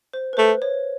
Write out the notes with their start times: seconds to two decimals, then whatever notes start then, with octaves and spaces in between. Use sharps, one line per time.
0.13 C5
0.33 B4
0.37 A3 C5
0.62 C#5